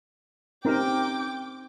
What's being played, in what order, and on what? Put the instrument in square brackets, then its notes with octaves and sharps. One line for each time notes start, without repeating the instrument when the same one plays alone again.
[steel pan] C4 A#4 [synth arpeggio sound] C#4 D#4 G4 [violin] G5 D6